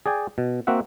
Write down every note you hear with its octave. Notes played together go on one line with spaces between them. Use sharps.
G#4 D5 G5 G#5
B2
A#3 C4 F#4 E5 F#5